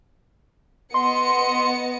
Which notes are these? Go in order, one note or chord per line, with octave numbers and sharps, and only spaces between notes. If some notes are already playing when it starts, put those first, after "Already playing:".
B3 D#5 C6 C#7